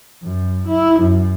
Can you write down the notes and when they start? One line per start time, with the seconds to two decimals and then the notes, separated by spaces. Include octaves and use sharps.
0.23 F#2
0.67 E4
1.00 F#2